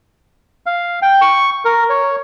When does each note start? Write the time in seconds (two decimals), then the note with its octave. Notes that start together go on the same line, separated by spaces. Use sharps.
0.66 F5
1.02 G5
1.21 C#6
1.65 A#4
1.90 C#5